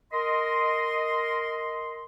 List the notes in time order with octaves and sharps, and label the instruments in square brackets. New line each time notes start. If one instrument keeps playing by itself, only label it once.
[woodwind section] A#4 D#5 C6